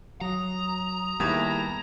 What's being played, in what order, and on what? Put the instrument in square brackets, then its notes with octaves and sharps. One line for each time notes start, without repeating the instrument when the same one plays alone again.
[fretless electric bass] F#3 [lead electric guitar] A#5 [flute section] D#6
[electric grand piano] D#2 D#6 G#6 [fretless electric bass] G3 B3 [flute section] E4 G#4 E5